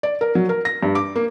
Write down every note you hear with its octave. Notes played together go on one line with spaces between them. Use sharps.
D5
A#4
F#3
A#4
A#6
G2
D6
A#3